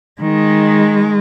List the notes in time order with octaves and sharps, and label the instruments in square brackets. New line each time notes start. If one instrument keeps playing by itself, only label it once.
[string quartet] D#3 [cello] G#3